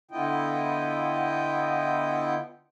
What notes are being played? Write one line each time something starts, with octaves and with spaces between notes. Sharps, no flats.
D3 B3 E4 F4 D#5 G5